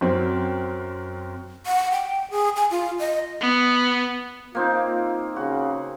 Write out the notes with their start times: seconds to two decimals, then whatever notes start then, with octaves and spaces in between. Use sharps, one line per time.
0.01 F#2 C4
1.66 F#5
1.92 G5
2.31 G#4
2.56 G#5
2.71 F4
2.99 D#5
3.41 B3
4.55 A#3 C4 D#4 F4
5.36 C#3 F#4